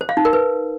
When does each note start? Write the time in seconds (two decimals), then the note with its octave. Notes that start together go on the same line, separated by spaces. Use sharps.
0.01 C5
0.09 F5
0.17 D#4
0.25 A#4
0.33 B4